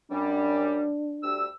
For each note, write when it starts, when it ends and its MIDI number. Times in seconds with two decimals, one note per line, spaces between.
0.11 0.85 42
0.11 0.85 55
0.11 1.43 62
1.23 1.46 38
1.23 1.46 55
1.23 1.46 88